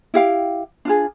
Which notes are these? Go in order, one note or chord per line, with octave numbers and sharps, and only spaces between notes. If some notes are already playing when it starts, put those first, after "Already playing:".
E4 G4 F5 G5
D4 F4 G#4